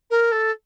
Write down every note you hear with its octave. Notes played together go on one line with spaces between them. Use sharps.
A#4
A4